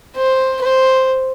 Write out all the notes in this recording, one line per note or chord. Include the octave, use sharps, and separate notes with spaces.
C5
C5